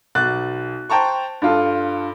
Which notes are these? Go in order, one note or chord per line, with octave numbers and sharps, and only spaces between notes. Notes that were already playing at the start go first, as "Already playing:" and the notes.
B1 F#6 A6
C5 G5 A5 A#5 C#6
G2 F4 A4